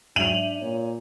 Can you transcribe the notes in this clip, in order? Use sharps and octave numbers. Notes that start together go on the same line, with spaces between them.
G#2 F#3 D4 E5 D#7 F7 F#7
A#2 C#5